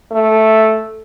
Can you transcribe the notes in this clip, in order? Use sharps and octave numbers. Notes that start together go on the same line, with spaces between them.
A3